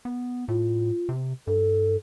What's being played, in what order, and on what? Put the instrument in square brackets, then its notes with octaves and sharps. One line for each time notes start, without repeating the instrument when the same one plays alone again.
[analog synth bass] B3
[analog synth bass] A2 [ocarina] F4
[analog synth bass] C3
[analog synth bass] G2 [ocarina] A4